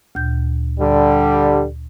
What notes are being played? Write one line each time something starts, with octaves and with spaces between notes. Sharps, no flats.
D2 A#2 G6
D3 G3